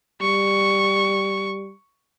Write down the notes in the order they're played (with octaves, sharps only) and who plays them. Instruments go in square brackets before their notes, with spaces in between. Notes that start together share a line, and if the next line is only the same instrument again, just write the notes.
[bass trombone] G3 [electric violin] C#6